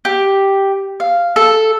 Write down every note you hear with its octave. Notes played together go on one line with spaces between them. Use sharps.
G4
F5
A4